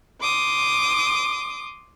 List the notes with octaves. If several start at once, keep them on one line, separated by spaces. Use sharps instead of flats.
C6 D6 D#6